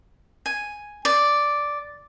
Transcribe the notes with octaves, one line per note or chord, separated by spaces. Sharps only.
G#5
D5